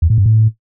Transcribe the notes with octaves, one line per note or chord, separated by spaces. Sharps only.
E2
A2
G2
A2